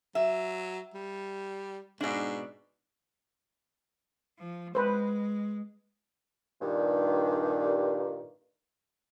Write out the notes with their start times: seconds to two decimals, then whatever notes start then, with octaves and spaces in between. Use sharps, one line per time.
0.15 F#3 E5
0.94 G3
2.01 G#2 B2 D4
4.39 F3
4.75 G#3 B4 C5
6.62 G2 A#2 D#3